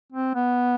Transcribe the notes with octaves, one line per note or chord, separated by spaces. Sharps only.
C4
B3